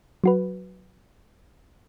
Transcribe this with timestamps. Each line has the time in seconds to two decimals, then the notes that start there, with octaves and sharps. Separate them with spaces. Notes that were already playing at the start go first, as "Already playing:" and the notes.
0.24 F#3 F#4 B4